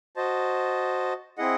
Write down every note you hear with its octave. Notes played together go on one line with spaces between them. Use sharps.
F#4 C5 D#5 A5
C4 E4 G#4 D#5 F#5